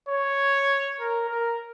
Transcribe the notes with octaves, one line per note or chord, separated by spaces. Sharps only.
C#5
A#4
A#4